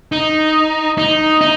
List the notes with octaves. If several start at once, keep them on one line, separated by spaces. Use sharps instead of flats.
D#4
D#4
D#4